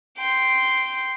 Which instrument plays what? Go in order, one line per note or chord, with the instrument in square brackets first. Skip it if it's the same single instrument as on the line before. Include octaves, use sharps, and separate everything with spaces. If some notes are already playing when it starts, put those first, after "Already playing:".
[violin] G5 C6